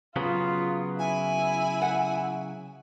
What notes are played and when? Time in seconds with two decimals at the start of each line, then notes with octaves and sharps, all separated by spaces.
0.16 C#3 F#3 B3 F4
0.99 E4 G#5
1.82 F#5